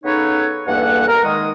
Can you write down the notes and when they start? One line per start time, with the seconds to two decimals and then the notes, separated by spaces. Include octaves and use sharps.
0.04 C#3 B3 D#4 A4 B4 C#5
0.67 E2 G2 A#3 A4 F#5
1.08 A#4
1.24 D#3 G#3 D#6